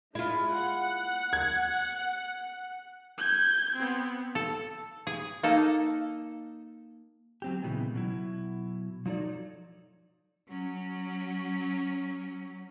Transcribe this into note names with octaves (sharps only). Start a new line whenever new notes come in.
G#3 E4 F4
F#5
G#6
G6 G#6
B3 C4
A4
G#4
A#3 D#4 A4
F#3 C4 G4
A#2 C#3 E3 G#3 B3
B2 F#3 E4
F3 F#3 D#4 A4 D5
F#3 C#4